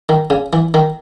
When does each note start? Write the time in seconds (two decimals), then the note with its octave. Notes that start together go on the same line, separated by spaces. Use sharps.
0.09 D#3
0.30 C#3
0.53 E3
0.74 D#3